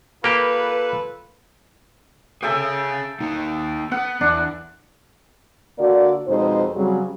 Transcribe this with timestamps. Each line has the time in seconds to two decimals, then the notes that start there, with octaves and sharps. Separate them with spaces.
0.24 A#3 F4 G4 A4 B4
2.43 G#4 A4 C#5 E5 G5 G#5
3.20 A#3 D#4
3.92 B3 F#5
4.21 E2 D4
5.79 D3 A#3 F#4 D5
6.28 F2 B2 G#3 D#4 C5
6.76 C#3 F#3 G3 C4 G4 G#4